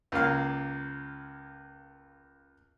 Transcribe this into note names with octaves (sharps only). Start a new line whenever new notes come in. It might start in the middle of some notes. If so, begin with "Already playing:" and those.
C#2 A#3 F5